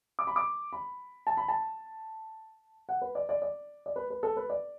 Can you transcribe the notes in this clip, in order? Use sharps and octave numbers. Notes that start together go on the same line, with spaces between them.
D6
B5
D6
B5
A5
B5
A5
F#5
B4
D5
D5
D5
D5
B4
B4
A4
B4
D5